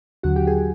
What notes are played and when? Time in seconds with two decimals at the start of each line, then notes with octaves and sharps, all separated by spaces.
0.23 D#2 D3 F#3 F#4 F#5
0.36 G4 G5
0.47 G#4 G#5